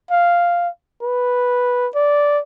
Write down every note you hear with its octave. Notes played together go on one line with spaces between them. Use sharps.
F5
B4
D5